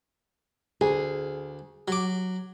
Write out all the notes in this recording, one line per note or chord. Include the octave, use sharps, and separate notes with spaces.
D2 G#4
F#3 D6